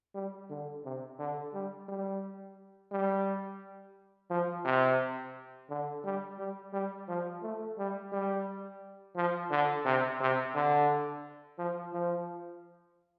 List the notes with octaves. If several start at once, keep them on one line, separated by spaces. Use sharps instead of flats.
G3
D3
C3
D3
G3
G3
G3
F3
C3
D3
G3
G3
G3
F3
A3
G3
G3
F3
D3
C3
C3
D3
F3
F3